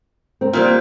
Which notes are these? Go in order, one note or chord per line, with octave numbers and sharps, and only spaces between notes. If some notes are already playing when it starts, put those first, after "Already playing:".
C4 A#4
A#2 G3